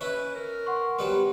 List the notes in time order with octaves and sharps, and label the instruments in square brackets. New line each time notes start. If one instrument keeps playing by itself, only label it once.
[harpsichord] C#4 E4 [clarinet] B4
[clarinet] A#4
[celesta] F#5 C6 C#6
[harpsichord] F#3 G3 B3